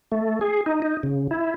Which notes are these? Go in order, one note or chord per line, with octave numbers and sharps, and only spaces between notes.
A3
G#4
D#4
D#4
C#3
E4